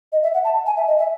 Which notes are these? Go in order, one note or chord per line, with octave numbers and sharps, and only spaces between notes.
D#5
E5
F#5
A5
G#5
E5
D#5
E5